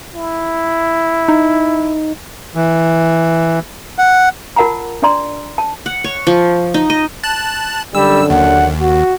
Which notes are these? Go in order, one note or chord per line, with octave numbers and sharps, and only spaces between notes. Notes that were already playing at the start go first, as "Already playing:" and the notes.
E4
D#4
E3
F#5
F4 A#4 F#5 A5 A#5
D4 D5 D#5 A#5 C6
A5
F#5
C#5
F3
D#4
D#5
A5 F#6
F#2 D3 G3 E6
D#2 F#5
F#4